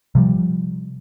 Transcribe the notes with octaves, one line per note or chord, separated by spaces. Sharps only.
C3 F3 G3